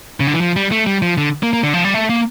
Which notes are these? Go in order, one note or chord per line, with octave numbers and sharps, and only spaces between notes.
C#3
D3
E3
F3
G3
A3
G3
F3
D3
A#3
A#3
D3
F3
G3
A3
A#3